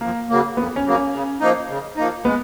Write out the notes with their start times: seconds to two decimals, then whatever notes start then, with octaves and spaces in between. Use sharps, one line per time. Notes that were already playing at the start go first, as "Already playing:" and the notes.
0.01 F2 A#3
0.29 C#3 F#3 A#3
0.57 F2 B3
0.76 C#4
0.85 C#3 F#3 A#3
0.94 C#4
1.13 C#3
1.40 F3 A#3 D#4
1.69 C#3
1.97 F3 A#3 D#4
2.25 G#3 B3